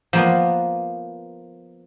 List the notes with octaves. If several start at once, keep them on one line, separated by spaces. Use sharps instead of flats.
F3 A#3 B3